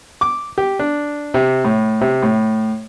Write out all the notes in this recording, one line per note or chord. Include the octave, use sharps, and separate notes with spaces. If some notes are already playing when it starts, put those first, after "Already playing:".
D6
G4
D4
C3
A2
C3
A2